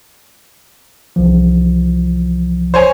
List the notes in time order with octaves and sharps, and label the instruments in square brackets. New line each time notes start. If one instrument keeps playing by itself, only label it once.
[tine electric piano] C2 E3 F3
[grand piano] C5 C#5 G#5